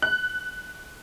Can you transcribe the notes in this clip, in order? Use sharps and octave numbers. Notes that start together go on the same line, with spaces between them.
F#6